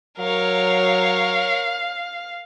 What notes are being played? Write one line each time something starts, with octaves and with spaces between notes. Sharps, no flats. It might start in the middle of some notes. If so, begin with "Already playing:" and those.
F#3 A#4 C#5 F5